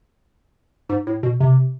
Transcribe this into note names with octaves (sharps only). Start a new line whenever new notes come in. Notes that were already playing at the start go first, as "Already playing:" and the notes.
G#2
A2
B2
C3